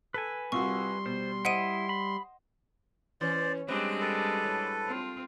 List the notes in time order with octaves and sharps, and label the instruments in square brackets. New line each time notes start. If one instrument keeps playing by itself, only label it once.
[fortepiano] A4 [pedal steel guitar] B4 G#5
[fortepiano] C2 F4 F#4 [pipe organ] G3 C6 [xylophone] C#6
[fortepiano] B2 [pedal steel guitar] C5
[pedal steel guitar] E4 [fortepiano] C5 D#5 [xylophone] F#5 D7 D#7
[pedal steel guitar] B5
[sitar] E3 C#4 [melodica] C5 D5
[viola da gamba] G3 G#3 D4 [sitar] C4 [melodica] B4
[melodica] A4 B4
[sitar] A2
[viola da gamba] C4 F4